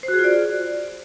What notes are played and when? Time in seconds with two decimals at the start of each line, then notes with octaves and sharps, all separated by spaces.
0.03 C5
0.08 F#4
0.14 G#4
0.19 F4
0.24 D5